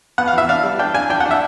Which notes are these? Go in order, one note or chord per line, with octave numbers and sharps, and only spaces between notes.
B3 F#5
F5
E3 E5
D4 F5
G3
D4 G5
D4 G#5
D4 G5
F#5
D4
E5